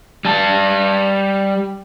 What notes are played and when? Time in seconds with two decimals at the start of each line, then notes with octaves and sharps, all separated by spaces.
0.25 G3 A5